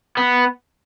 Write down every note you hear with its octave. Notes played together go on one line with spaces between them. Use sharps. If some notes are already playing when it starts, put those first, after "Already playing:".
B3